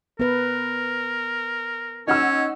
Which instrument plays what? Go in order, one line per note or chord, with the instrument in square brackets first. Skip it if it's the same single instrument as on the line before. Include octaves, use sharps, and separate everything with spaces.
[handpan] B3 B4 [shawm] A#4
[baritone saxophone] C#4 [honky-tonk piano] D#4 F#5 E6